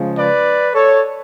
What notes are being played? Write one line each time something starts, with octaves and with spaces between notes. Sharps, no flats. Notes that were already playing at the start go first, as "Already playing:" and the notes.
Already playing: C#3 F3 G#3
B4 D5
A4 C#5